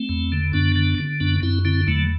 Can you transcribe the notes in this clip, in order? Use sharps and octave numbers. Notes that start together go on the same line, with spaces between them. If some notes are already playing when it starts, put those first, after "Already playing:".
Already playing: A3 C4
E2
D3
F#2 B3 D4
D3
D3
F#2 B3 D4
F#2 C4 E4
D3 C4 E4
E2 F#3 A3